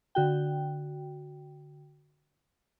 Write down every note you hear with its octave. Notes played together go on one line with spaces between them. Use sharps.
D3 F#4 G5